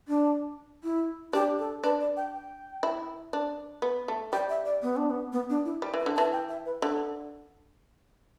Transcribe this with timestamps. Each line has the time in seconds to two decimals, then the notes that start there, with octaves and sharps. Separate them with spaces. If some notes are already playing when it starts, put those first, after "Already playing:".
0.08 D4
0.84 E4
1.33 D4 G4
1.59 A4
1.83 D4 B4
2.00 D5
2.17 G5
2.33 G5
2.83 E4
3.33 D4
3.82 B3
4.08 A3
4.32 G3 G5
4.49 E5
4.65 D5
4.82 B3
4.97 D4
5.10 B3
5.32 B3
5.50 D4
5.65 E4
5.82 G3
5.94 E3
5.99 B4
6.06 D3
6.16 E3 A5
6.32 G5
6.49 E5
6.66 B4
6.82 D3 A4